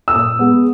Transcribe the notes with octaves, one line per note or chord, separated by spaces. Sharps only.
E6
A#2 D#6
G#3 B3